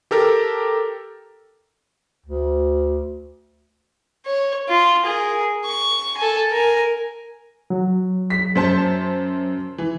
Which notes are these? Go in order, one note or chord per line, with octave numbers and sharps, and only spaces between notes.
G4 A4 A#4
D2
C#5
F4
G#4 A#4
C#6
A4 G#5
A#4 G#5
F#3
B6
F#2 C5 A5
E3